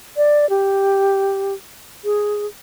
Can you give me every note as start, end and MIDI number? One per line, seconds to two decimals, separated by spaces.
0.17 0.48 74
0.50 1.54 67
2.05 2.46 68